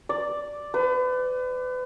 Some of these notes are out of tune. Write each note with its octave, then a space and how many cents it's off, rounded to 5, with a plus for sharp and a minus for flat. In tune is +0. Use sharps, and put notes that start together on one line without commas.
D5 +0
B4 +35